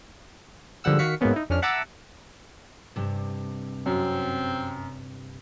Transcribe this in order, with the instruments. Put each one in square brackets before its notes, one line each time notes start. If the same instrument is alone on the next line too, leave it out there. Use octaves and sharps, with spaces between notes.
[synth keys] G#2 D3 F3 G3 F#5 E6
D#3 F#4 F5 B6 C#7
G#2 F#3 G#3 A#3 B3 C#4
D#4 E4
F2 C#4 D4 F6
E5 F#5 A5 A#5 D6 E6
[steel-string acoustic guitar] G2 C3
[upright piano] F#2 [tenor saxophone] C4